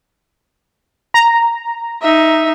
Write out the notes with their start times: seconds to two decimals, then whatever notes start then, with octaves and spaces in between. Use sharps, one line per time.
1.14 A#5
2.02 D#4 E5